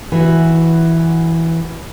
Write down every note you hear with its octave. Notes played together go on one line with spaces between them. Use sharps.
E3 F#4